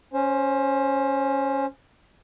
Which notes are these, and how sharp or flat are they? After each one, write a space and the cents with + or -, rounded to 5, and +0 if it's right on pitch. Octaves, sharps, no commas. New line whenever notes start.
C#4 +0 C5 +20